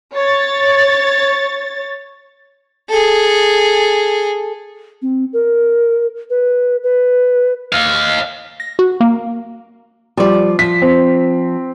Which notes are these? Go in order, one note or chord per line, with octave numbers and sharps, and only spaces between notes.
C#5 A6
G#4 A4
C4
A#4
B4
B4
D#5 F5
A#6
F#4
A#3
F3 G3 D5
F3 B6
C4